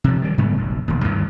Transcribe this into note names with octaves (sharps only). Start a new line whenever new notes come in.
C3 F3
D#3 G3
G#2 D3 G3 B3
F#1 B1
E1 D#2
D2 G2 D#3 E3